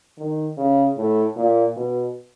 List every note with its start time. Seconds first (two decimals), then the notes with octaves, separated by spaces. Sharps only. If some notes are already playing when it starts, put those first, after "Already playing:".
0.18 D#3
0.57 C#3
0.97 A2
1.37 A#2
1.76 B2